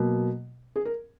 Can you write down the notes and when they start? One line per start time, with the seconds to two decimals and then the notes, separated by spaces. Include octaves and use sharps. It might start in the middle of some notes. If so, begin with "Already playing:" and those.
Already playing: B2 F#3 A#3
0.76 G#4
0.85 A#4